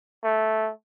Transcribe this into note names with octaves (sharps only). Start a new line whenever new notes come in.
A3